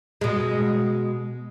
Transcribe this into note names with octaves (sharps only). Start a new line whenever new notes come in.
B2 G#3